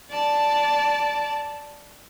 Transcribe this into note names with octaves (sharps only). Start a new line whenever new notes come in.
D5 A5